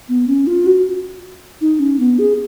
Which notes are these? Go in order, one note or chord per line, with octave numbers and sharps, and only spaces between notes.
B3
C#4
F4
F#4
D#4
C#4
B3
G#4